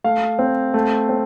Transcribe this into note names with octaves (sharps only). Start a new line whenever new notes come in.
A3 F5
C4
A3
C4